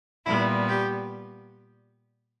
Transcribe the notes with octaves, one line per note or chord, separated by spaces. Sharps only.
A#2 G3 B3 E4
G4